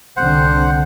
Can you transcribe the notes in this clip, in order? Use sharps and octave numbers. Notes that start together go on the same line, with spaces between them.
C2 D3 C4 C5 F#5